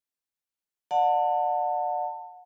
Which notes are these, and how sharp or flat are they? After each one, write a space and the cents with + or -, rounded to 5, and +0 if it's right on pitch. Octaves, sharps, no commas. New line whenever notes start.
D5 +20 F#5 -30 A5 +25